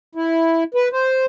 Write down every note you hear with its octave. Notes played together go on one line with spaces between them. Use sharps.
E4
B4
C5